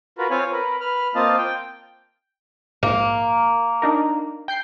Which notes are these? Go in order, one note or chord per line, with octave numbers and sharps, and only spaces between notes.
F4 F#4 A#4 B4
C4 F4 C#5 F5 G#5
A#4 B4
B4 F6
A#3 C4 F4 D#5 F5 A5
G5
A#1 G#2 A#3
D4 D#4 A#4
G5 G6 C7